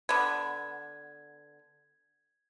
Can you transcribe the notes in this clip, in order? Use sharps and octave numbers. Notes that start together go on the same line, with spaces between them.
D3 B3 G#6